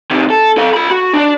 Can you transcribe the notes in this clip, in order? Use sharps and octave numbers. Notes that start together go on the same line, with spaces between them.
C3 D#3
A4
A4 F5
F4 B5
F#4
D4 D5